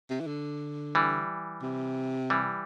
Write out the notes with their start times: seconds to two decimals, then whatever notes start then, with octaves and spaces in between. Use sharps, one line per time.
0.10 C3
0.20 E3
0.27 D3
0.95 E3 G3
1.62 C3
2.30 E3 G3